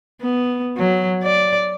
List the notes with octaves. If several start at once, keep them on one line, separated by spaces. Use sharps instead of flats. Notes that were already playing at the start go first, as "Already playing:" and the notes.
B3
F#3
D5